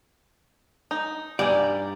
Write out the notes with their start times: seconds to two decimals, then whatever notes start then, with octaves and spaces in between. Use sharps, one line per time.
0.91 D#4
1.39 G2 G3 D#4 D5 G#5